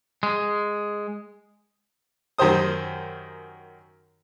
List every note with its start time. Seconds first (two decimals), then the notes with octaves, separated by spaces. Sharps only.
0.23 G#3
2.38 F#2 D#3 G4 C5 D#6